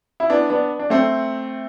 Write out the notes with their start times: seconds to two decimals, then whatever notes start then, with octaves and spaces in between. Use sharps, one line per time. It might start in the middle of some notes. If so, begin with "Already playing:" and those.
0.20 E4
0.30 B3 D4
0.50 B3 D4
0.79 D4
0.90 A3 C4